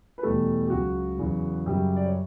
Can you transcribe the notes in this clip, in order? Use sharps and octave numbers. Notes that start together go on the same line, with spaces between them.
B4
E2 B2 G3 A3 A4
G4
C#2 C#3 F#3 F#4
E2 C#3 F#3
F#2 C#3 F#3 G3 G4
D5
C#5